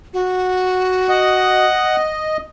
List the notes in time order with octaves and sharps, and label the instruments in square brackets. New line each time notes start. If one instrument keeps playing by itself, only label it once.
[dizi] F#4
[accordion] D#5 [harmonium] F#5